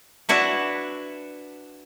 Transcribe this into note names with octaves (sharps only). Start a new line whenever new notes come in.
D4 E4 F#4 B4